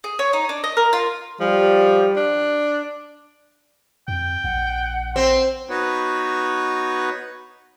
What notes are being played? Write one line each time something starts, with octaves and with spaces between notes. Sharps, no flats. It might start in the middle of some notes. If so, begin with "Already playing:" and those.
G#4
C#5
D#4
D4
D#5
A#4
F4
F3 G3
D4
F2 G5
A#1 F#5
C4 C6
B3 D#4 F#4 B4 C#5